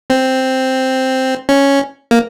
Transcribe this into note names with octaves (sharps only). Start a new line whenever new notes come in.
C4
C#4
A#3